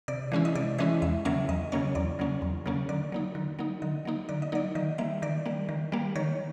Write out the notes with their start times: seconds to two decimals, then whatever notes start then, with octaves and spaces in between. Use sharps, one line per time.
0.08 C3 D5
0.32 E3 G#3 C#4 E4
0.45 D#5
0.55 C3 D5
0.78 E3 G#3 C#4 E4 D#5
1.02 E2 E5
1.25 C#3 F#3 A#3 C#4 E5
1.48 E2 D#5
1.72 C#3 F#3 A#3 C#4 C#5
1.95 E2 D5
2.19 C#3 F#3 A#3 C#4
2.42 E2
2.66 C#3 F#3 A#3 C#4
2.89 D3 D5
3.12 F#3 A#3 D#4
3.35 D3
3.59 F#3 A#3 D#4
3.82 D3 D#5
4.05 F#3 A#3 D#4
4.29 D3 D5
4.42 D#5
4.52 F#3 A#3 D#4 D5
4.75 D#3 D#5
4.98 G3 A#3 E5
5.22 D#3 D5
5.46 G3 A#3
5.69 D#3
5.92 G3 A#3
6.16 D#3 C#5